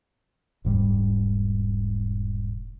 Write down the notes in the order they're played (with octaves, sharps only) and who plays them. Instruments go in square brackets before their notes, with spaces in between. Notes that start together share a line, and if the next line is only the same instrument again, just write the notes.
[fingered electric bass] E1 G#2 G3